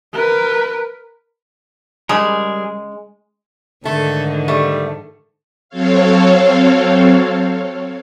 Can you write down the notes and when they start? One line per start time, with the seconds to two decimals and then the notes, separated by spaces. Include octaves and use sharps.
0.14 A#4 B4
2.09 C#3 G3 G#3 G#4 A#4
3.85 G#2 D3 D#3 A3 A4
4.48 G3 A3
5.69 F#3 C4 A4 C#5 F5